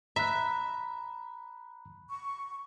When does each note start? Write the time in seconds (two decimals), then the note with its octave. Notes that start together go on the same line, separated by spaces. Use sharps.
0.16 E5 A#5 B5 F#6
2.09 C#6